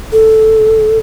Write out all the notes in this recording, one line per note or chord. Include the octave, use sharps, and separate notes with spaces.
A4